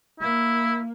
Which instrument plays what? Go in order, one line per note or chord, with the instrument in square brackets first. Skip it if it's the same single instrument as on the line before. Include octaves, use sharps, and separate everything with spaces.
[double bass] A#3 [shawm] E4